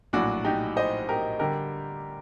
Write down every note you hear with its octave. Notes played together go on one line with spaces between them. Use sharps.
A#1 A2 F#3 D4 F#4
D#4 G4
C5 D#5
G4 A#4
D3 G3 G4 A#4